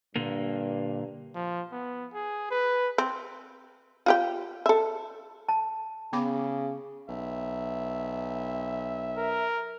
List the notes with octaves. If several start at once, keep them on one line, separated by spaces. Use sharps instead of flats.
G2 A#2 D3 A#3
F3
B3
G#4
B4
C4
F4 G4 G5
A4 E5
A5
C#3 B3 B5 D6
B1 E5
A#4